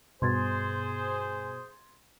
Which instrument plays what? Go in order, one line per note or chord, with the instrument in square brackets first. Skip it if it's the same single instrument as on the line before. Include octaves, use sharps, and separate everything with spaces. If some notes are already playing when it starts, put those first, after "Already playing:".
[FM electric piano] G2 [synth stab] B2 [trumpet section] G#4 C5 [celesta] C6 G#6 A6